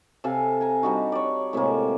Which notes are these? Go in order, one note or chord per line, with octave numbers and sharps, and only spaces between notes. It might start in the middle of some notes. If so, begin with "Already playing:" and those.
C3 A4 F5 G#5
G#5 A#5
G3 D4 D#4 F#4
C#5 D5
A2 C3 G#3 A#3